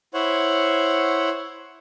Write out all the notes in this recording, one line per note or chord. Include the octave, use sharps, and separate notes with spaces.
E4 C5 C#5 F#5